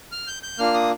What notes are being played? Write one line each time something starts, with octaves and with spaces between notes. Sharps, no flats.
F6
G6
G6
A#3 D4 F4 F6
D#6